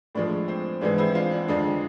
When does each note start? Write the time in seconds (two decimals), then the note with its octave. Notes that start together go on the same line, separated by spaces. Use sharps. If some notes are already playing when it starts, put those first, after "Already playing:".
0.15 A2 F3 G#3 D4
0.48 C4
0.81 G#2 E3 G#3 D4
0.98 C4 E4
1.15 D4 F4
1.32 D4
1.48 F2 D3 F3 G#3 D4